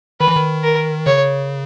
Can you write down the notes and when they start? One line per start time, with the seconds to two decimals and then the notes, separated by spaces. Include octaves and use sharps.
0.20 D#3 B4
0.28 E3
0.36 D#3
0.64 A#4
1.06 C#3 C#5